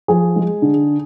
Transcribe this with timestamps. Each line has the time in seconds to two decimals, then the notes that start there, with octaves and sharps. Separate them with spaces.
0.08 F3 G#4
0.36 G#3
0.62 D3